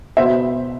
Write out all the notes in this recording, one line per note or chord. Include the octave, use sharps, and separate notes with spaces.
B2 B3 C5 E5